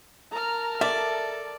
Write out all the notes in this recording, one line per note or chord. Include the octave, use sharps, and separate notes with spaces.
A#4 A5 A#5 F6
A4 D5 E5